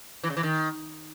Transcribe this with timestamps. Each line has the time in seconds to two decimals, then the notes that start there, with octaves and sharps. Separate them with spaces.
0.23 E3
0.30 C#3
0.37 E3
0.43 D#3